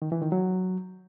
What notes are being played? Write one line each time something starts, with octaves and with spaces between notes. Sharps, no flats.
D#3
E3
D#3
F#3